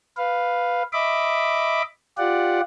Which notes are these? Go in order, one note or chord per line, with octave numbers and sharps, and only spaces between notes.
B4 F5
D#5 E5 B5 D6
F4 G4 D5 F#5